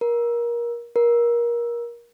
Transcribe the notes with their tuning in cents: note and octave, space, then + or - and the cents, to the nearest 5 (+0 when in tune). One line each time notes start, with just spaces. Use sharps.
A#4 +25
A#4 +25